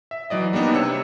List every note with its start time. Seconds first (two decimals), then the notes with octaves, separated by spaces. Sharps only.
0.11 E5
0.30 E3 F#3 D5 D#5
0.53 G3 A#3 B3 D4 D#4
0.74 C3 C#5 E6 C#7